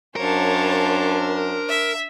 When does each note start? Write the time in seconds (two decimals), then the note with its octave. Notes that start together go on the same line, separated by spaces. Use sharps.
0.16 F#2 D4 A#4 C5 C#5 F5 A5
1.69 E5